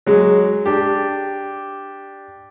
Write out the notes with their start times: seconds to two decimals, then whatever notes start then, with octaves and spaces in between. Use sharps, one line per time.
0.07 F#3 G#3
0.66 D4 G4